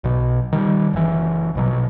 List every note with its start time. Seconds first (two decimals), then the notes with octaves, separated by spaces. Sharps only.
0.04 B1 B2
0.53 D#3 G3
0.93 F#1 E3
1.55 A#1 B2 F#3